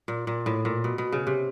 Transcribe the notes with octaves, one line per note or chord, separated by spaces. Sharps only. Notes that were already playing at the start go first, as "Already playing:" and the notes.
A#2
A#2
A2
A#2
B2
B2
C#3
C3